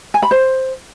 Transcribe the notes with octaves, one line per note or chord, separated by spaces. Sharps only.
G#5
B5
C5